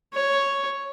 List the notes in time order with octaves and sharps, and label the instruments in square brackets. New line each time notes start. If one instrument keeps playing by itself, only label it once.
[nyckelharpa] C#5